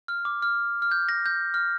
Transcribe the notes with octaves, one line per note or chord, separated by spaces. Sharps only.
F6
D6
F6
F6
G6
A#6
G6
F6